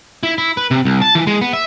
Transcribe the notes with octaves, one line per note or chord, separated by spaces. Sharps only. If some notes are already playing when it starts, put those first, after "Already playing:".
E4
E4
B4
C3
C2
A5
E3
G#3
B3
E5